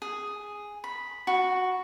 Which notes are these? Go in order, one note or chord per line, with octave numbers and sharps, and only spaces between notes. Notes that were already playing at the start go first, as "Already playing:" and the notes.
G#4
B5
F#4